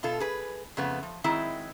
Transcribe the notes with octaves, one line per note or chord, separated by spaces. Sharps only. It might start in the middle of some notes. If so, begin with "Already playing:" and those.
B2 F4 A4
G#4 B4
F2 C#3 A3 B3
F3
D#3 F#3 G#3 C4 E4